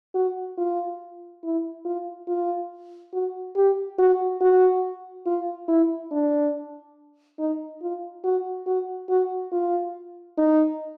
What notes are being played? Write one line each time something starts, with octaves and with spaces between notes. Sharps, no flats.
F#4
F4
E4
F4
F4
F#4
G4
F#4
F#4
F4
E4
D4
D#4
F4
F#4
F#4
F#4
F4
D#4